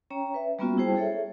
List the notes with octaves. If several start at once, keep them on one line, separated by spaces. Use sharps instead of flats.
C#4 C#5 G5 A#5
B4 E5
G3 A#3 B3 C#4 F4 F#4
G3 E4 G#4 C5 G5 A5
G#4 A4 C#5 E5